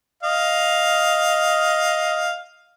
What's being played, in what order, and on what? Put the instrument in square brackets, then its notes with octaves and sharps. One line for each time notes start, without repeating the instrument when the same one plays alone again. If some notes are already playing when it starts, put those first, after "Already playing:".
[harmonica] D#5 F5